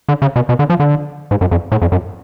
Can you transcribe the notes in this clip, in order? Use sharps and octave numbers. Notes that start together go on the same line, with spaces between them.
D3
C#3
B2
B2
D3
F3
D3
G#2
F#2
F2
A2
F2
F#2